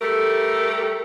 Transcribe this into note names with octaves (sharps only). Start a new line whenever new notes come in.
G3 A3 G4 A4 A#4